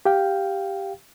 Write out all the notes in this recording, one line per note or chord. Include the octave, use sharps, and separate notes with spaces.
G4 F5 G5